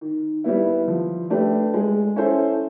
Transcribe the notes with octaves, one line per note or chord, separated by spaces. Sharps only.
D#3
G3 B3 E4
F3
A3 D4 G4 B4
G#3
C#4 E4 A4 C5